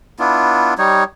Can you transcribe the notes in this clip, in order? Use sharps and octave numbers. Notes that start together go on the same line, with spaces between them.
B3 D4 E4 F4
G3 D#4 C#5